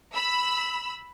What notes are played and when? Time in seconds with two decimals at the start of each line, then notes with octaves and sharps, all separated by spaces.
0.14 B5 E6